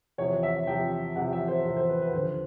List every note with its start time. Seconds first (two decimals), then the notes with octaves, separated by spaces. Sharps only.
0.18 E2 C3 F3 C#5
0.43 E5
0.67 E2 C3 F3 G5
1.16 E2 C3 F3 F#5
1.33 E5
1.48 C5
1.64 E2 C3 F3
1.77 C5
1.89 B4
2.02 B4
2.13 D#2 D3 F3 C5